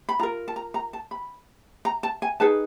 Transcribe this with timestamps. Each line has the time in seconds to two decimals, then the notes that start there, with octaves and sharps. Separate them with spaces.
0.09 B5
0.19 F4 A#5
0.23 A#4
0.48 A5
0.56 A#5
0.74 A#5
0.93 A5
1.11 B5
1.85 A#5
2.03 A5
2.22 G#5
2.40 D#4 G#4 B4 A5